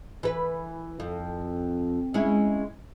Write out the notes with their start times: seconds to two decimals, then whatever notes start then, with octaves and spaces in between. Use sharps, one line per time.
0.23 E3 B4
1.00 F2
2.14 G#3 C#4 E4